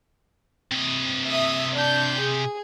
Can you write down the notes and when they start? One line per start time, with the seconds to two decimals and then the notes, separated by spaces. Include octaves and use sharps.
0.71 C3 D#5
1.27 E5 D#6
1.75 D4 G6
2.19 G#4